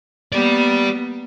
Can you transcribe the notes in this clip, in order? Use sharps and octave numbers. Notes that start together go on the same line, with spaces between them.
A#3 B3 G4 D5